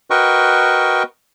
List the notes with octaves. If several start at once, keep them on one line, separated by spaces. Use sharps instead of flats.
F#4 A#4 B4 D#5 G5 C#6